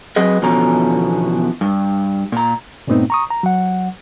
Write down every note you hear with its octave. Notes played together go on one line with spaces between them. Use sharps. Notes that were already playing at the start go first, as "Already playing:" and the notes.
F#3 C4 G#4 B4 D#5
E2 B2 D3 F3 C#4 A#5
G2
A#2 A#5
G2 A#2 A3 B3 C4 D#4
A#5 C#6 D#6
A#5
F#3 F#5